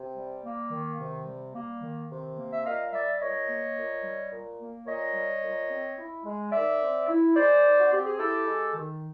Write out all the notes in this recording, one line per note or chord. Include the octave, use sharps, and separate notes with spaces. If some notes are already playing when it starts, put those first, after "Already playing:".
Already playing: C3
G3
A#3
D#3
C3
G3
A#3
D#3
C3
A#3
E5
A#2 D#5 F5
G3 D5 E5
A#2 C#5 D#5
A#3
A#2
G3
A#2
A#3
A#2 C#5 D#5
G3
A#2
C4
E4
G#3
D#3 D5 E5
C4
E4
G#3 C5 D5
D#3
F#4
C4 G4
G#4
E4 G4 A4
G#3
D#3